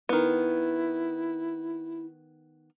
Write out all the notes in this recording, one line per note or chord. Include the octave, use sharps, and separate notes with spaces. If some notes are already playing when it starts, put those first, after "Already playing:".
D#3 B3 E4